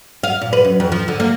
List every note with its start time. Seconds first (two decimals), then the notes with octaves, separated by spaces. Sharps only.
0.24 F5
0.41 A#2
0.53 B4
0.65 F#2
0.80 F2
0.92 F3
1.08 D3
1.20 A#3